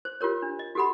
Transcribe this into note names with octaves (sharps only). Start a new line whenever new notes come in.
C5
F4 G4 A#4 C#5
D4
D#5
F#4 G4 A4 F#5 B5